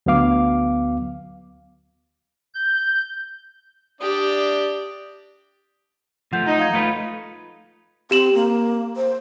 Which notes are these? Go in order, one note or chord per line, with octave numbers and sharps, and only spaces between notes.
D2 F#3 B3 F5 D6
G6
D4 G4 D5 D#6
F3 A3 F#5 G6
D#4
F5 G#6
A3 F4 B4
C4 G4 E7 F#7
A#3
C5